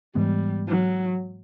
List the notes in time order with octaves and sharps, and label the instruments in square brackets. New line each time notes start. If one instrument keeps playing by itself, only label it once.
[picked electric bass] G#2 E3 G#3 B3 [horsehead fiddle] G3
[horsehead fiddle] F#3